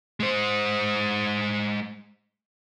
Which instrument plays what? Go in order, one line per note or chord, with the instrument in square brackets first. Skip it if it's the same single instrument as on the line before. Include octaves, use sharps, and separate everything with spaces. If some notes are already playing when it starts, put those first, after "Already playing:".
[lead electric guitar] G#3 C5